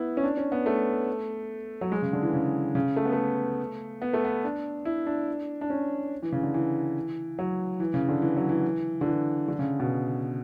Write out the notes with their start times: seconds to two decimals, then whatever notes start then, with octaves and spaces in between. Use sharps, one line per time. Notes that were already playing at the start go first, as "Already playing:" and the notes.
Already playing: B3 E4
0.17 C#4
0.24 D4
0.37 C#4
0.52 B3
0.66 A3
1.81 F#3
1.92 G#3
2.02 C#3
2.13 D3
2.22 E3
2.33 C#3
2.75 C#3
2.96 A3
3.05 B3
3.13 A3
4.02 B3
4.13 A3
4.25 B3
4.44 D4
4.85 E4
5.07 D4
5.61 D4
5.70 C#4
6.22 E3
6.32 C#3
6.43 D3
6.54 E3
7.39 F#3
7.80 E3
7.94 C#3
8.09 D3
8.22 E3
8.36 F#3
8.49 E3
9.01 D3
9.06 E3
9.48 D3
9.59 C#3
9.80 B2